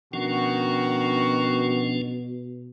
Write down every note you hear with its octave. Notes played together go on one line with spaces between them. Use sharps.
B2 D#3 F3 C#4 D4 F#4